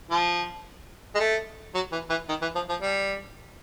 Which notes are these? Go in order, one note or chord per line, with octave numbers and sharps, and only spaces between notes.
F3
G#3
A3
F#3
E3
E3
D#3
E3
F3
F3
G3